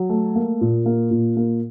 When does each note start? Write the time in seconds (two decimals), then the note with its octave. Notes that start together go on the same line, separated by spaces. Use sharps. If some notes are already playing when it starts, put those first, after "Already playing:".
Already playing: F#3
0.09 A3
0.35 A#3
0.61 A#2
0.86 A#3
1.11 A#2
1.37 A#3